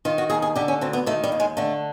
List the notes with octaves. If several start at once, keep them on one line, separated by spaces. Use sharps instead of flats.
D#3 F4
F#4
D#2 G#4
G#4
D3 G4
C#4
D2 C4
B3
D#3 A3
G3
D#2
G#3
D3 A3